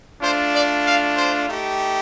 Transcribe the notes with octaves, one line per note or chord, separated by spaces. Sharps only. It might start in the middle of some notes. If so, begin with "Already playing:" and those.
A3 D4 F4 C5
D5
F5
C5
A3 D#4 G4